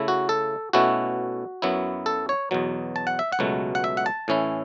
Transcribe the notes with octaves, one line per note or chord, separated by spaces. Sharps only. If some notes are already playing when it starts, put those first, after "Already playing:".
Already playing: C#3 A3 E4
F#4
A4
B2 A3 C#4 E4 F#4
F#2 F#3 B3 E4
A4
C#5
E2 B2 F#3
A5
F#5
E5
F#5
C#2 B2 F#3 A3
F#5
E5
F#5
A5
A2 E3 C#4 E4